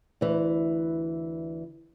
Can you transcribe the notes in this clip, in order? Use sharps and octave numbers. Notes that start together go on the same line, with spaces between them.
D2 E3